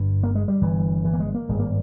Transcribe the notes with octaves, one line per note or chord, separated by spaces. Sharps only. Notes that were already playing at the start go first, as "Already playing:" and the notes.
Already playing: G1 G2
A#3
G#3
G3
G1 G2 E3
E3
A#3
G#3
A#3
G#1 G2 G#3
A#3